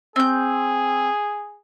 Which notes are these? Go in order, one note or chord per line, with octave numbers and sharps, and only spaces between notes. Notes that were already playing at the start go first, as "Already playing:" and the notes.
C4 G#4 G6